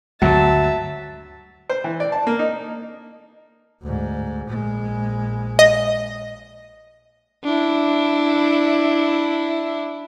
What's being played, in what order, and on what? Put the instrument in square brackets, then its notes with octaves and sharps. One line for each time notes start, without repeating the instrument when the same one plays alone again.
[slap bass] D2 G2 D3 [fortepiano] F#3 [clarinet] E5 [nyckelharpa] A5
[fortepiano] C5
E3
D5
A5
A#3
D#4
[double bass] D2 G#2
A#1 G#3
[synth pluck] D#5
[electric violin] D4 E4